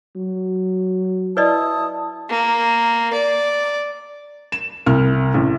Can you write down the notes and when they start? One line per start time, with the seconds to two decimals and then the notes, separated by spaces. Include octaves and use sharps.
0.16 F#3
1.37 E4 B4 D5 D#5 A5 D#6
2.29 A#3
3.13 D5
4.52 E7
4.86 C2 F6
5.34 A1